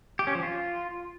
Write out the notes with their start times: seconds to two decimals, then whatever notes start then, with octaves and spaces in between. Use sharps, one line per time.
0.19 G4
0.27 C#4
0.35 F3
0.43 F4